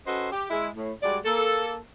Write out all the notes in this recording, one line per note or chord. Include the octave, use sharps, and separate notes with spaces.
C#4 F#4 A4 B4 C5 D#5
G4
G#3 E4
A2
G3 G#3 F#4 D5
A#3 A4